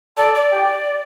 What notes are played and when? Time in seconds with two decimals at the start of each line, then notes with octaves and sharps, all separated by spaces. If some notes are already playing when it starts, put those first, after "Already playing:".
0.17 A4 D5
0.35 D5
0.52 G4